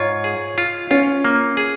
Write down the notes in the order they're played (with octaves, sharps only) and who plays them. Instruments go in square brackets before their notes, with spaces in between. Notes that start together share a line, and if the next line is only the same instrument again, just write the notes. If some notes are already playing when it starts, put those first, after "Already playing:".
Already playing: [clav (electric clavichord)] G#2 F4 [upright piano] C#5
[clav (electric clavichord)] G#4
F4
[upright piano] C#4 [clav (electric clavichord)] F4
[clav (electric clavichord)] A#3
G#4